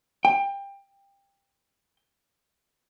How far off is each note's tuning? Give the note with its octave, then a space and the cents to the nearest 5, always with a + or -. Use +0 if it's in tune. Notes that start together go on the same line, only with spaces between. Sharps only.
G5 +20